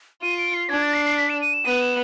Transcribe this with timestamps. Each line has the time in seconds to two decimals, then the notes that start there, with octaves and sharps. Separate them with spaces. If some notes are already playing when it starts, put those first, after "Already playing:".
0.22 F4 D#7
0.38 D7
0.54 C7
0.69 D4 G#6
0.82 A6
0.94 C7
1.06 C7
1.17 B6
1.30 E7
1.41 D#7
1.54 E7
1.65 B3 D#7
1.81 E7